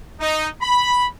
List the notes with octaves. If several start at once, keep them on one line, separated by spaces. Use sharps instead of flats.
D#4
B5